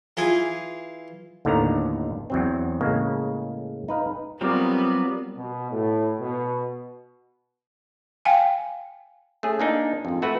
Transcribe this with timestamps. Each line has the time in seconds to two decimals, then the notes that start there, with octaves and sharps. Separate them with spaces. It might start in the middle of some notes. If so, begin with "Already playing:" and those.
0.17 E3 F4 G#4 G#5
1.45 D#2 A2 D3 D#3 B3 A#5
2.30 E2 F#3 C4
2.81 A2 C#3 G#3 A#3
3.88 D#4 B4 F5
4.41 F#3 G3 B3 C4 F4 A#4 D5
5.35 B2
5.71 A2
6.20 B2
8.25 F5 G5 G#5
9.43 A3 C#4 G#4
9.60 A#3 D4 D#4
10.05 F2 G#2
10.22 A3 F#4 B4 E5